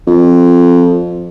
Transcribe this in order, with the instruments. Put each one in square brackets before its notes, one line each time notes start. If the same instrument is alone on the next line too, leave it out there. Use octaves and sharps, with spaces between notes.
[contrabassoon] F2